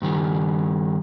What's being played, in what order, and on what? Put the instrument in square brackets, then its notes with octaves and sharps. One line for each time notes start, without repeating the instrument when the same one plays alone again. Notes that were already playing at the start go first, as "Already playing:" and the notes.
[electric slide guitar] G2 D#3 G3